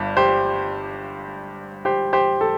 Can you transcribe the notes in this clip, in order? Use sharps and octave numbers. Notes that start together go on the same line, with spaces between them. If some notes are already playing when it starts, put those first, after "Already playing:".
Already playing: G1 G2
G4 C5
G4 C5
G4 C5
A4